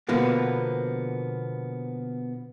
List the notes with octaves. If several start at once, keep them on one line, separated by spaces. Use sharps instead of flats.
B2 D3 F3 A#3 B3